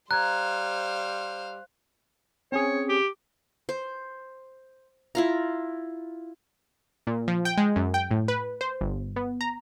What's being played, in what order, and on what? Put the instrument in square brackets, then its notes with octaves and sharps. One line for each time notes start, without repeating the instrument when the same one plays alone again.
[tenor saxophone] G3 [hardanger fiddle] C5 F5 [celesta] A#5 G#6 [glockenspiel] F#6
[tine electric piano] C4 C#4 G#4 [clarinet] C#5
[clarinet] G4
[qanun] C5
E4 F4 A#5
[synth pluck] A#2
F3
G5
G#3
F#2
G5
A2
B4
C5
G1
B3
A#5